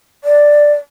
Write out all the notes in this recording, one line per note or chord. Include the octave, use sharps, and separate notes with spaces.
D5